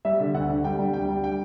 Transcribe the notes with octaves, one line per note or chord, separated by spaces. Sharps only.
G3 E5
D3
D2 F#5
D3
G3 G5
G3
D2 G5
G3
G5